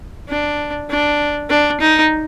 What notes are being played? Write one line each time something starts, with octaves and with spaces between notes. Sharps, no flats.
D4
D4
D4
D#4